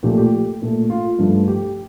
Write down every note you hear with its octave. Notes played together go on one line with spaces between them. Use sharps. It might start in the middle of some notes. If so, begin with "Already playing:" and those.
A#2 F3 A3 G4
G4
A#2 A3
F4
G2 F3 A3
G4